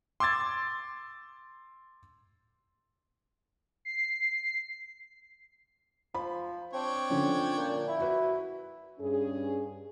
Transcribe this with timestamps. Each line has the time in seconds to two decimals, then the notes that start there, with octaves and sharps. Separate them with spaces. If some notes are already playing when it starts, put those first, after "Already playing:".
0.20 C6 D6 E6 G#6 A6
3.85 C7
6.14 F3 B5
6.73 C4 D4 C#5 G5
7.10 D3 F3 C#4
7.57 A#2
7.88 E4
8.00 F#4 B4
9.00 G2 C#4 G#4